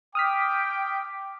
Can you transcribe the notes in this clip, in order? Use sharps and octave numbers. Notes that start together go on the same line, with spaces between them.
G5 D6 D#6 F6 B6